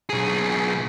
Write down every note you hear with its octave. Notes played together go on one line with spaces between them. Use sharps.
B1 G#4